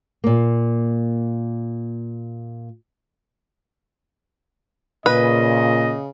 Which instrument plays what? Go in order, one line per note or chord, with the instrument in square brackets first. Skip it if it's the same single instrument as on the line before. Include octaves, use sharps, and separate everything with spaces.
[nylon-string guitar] A#2 A#3
[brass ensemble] A#2 [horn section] C#3 [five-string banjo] B4 [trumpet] D#5